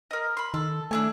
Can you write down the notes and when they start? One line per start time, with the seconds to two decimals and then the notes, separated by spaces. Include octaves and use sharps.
0.11 A#4 D#5
0.37 B5 C6
0.54 D#3 A4
0.91 A3 D4 E4 G#5